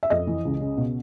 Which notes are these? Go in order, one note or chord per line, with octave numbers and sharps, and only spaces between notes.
E5
F2 D#5
E3
C#2
C#3
B2